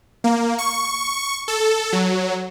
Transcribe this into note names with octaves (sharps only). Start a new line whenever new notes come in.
A#3
C#6
A4
F#3